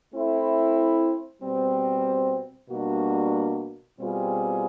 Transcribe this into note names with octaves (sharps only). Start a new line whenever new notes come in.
A3 C4 E4
B2 G3 C4
B2 G3 A#3 D4 F#4
B2 G3 C4 F4 G#4